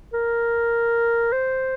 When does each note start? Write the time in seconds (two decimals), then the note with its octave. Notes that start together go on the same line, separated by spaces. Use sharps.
0.13 A#4
1.32 C5